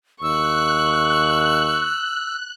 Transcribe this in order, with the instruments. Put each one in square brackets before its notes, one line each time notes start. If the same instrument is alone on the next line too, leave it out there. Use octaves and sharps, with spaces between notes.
[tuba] D#2 [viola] C#6 [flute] E6 [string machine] F#6